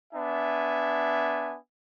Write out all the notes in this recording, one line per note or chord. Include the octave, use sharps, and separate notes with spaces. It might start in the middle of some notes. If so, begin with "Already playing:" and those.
B3 D4 E5 G#5